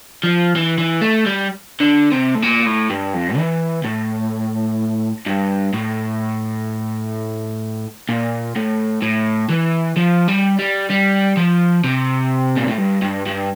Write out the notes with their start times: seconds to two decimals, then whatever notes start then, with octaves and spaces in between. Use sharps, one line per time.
0.24 F3
0.56 E3
0.78 E3
1.02 A3
1.26 G3
1.80 D3
2.12 C3
2.35 A2
2.43 A#2
2.66 A2
2.90 G2
3.13 F2
3.37 E3
3.85 A2
5.26 G2
5.73 A2
8.09 A#2
8.56 A2
9.02 A2
9.49 E3
9.97 F3
10.28 G3
10.59 G3
10.90 G3
11.37 F3
11.84 C3
12.57 A#2
12.68 A2
12.78 G2
13.02 G2
13.26 G2